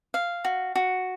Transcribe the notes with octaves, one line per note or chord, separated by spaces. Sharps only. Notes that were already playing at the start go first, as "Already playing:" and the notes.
F5
F#4
F#4